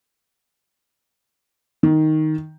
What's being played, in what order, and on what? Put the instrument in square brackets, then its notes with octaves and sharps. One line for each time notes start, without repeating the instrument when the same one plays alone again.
[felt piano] D#3